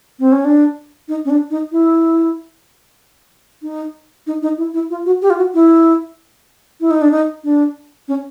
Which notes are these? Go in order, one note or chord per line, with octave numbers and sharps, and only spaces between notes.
C4
C#4
D4
D#4
C#4
D4
D#4
E4
D#4
D#4
D#4
E4
E4
F4
F#4
G4
F4
F#4
E4
E4
D#4
D4
D#4
D4
C#4